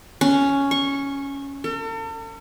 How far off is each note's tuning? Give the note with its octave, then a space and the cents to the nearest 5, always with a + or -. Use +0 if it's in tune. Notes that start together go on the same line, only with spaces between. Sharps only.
C#4 +5
C#6 -20
A4 +45